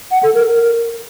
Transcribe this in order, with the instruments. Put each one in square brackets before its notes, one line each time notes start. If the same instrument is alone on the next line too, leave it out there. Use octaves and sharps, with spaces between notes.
[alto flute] F#5
A4
A#4
A#4